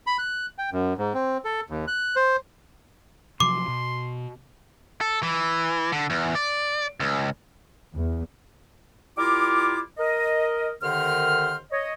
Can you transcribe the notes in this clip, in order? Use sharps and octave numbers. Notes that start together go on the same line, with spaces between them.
B5
F#6
G5
F#2
G#2
C4
A4
D#2
F#6
C5
C3 F3 F#3 C6 D6
B2
A4
E3
D3
E2
D5
C#2
E2
G3 E4 F4 A#4 D6
A#4 D#5
D#2 D3 D#3 C5 F6
C#5 D#5